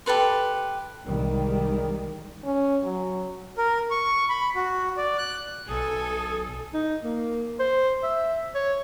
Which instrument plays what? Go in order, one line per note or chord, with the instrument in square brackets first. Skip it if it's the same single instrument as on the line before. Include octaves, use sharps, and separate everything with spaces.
[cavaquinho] G4 A4 B4 C6
[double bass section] C2 D#3 G3 G#3
[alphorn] C#4
F#3
[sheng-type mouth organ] A#4
C#6
B5
F#4
D5
F#6
[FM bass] B1 [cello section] A4 [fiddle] G#5 [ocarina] D#6
[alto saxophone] D#4
A#3
C5
E5
C#5